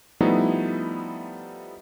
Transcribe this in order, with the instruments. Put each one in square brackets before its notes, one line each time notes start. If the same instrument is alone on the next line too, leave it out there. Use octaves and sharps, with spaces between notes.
[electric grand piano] F3 G3 A3 B3 D#4 E4